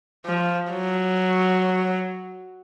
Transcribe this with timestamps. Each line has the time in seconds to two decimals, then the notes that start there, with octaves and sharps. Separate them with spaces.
0.25 F3
0.71 F#3